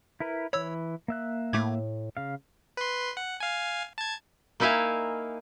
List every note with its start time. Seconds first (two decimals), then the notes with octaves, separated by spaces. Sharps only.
0.20 E4 A#4 B4
0.53 E3 C#5 B5 E6
1.08 A#3 E5 F#6
1.53 A2 A3 D6 G#6
2.17 C#3 F5
2.77 B4 C6
3.17 F#5
3.40 F5 G#5
3.98 A5 G#6
4.60 A#3 D#4 E4 E5 F5 G#5